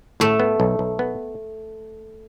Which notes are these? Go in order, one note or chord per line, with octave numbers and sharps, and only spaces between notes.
A2 A3
B3
B1
B1
B3